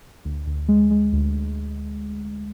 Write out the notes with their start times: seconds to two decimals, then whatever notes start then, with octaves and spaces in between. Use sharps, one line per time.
0.25 D2
0.47 D2
0.68 G#3
0.91 G#3
1.13 D2